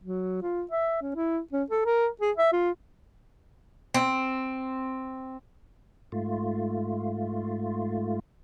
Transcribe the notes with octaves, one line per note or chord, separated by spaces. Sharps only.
F#3
F4
E5
C#4
E4
C#4
A4
A#4
G#4
E5
F4
C4
G#2 A3 F4